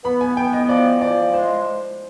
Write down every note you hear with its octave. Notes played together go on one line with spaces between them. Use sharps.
B3 B5
G#5
B3 G5
D#5
F3 D5
F3 D5
G#3 C5